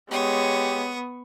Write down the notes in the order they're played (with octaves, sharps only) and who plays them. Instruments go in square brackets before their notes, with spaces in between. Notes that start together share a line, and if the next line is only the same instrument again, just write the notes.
[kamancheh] G#3 C#5 [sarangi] B3 [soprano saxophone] G4 [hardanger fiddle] C#6 D#6